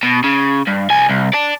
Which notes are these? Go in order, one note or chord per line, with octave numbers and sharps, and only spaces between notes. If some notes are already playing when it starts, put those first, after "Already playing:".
B2
C#3
G2
C2 G#5
C2
D5 A5